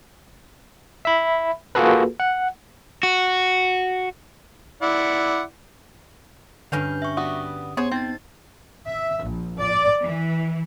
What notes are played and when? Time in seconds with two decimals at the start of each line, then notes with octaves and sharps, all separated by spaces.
1.05 E5 B5
1.75 A#3 F4 F#4 G#4 A4 B4
2.20 F#5
3.03 F#4
4.82 E4 D5 F#5
6.72 G2 D3 C#4 B4 G5 G6
7.02 E5 C#6
7.17 G3 B3 F#4 D#6
7.77 B3 G#4 C5 C#5
7.92 C4 D#4 A6
8.90 E5
9.27 A#1
9.60 D5
10.02 E3